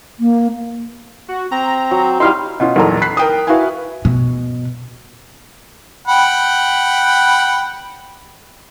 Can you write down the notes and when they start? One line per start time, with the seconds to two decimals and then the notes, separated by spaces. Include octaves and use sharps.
0.20 A#3
1.28 F#4
1.51 C4 A#5
1.91 F#3
2.20 G3 D#4 E4 F5 C6
2.60 B2 C#4 F4
2.76 B1 E2 A#2 A4 A#5
3.02 B5 F#6 B6 C7
3.17 A#4 G5 D#6
3.47 E4 F#4 B4 E5 F5 G#5
4.05 B2
6.07 F#5 G5 B5